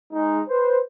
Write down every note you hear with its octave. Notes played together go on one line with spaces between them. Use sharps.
G#3 D#4
B4 C5